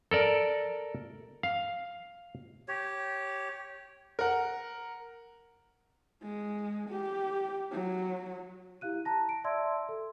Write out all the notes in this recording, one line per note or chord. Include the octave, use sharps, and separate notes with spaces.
A4 A#4 D5
F5
G4 C#5
A#4 F#5
G#3
G4
F#3
E4 G4 F5 F#6 D#7
A5 A#5 A#6
D7
D5 E5 A5 C6 E6 G#6
A4